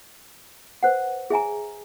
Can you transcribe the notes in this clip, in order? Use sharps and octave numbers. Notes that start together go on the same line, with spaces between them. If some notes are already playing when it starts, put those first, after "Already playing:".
B4 C5 F#5
G#4 E5 G#5 A#5